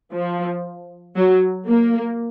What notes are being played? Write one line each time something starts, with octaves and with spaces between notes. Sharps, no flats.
F3
F#3
A#3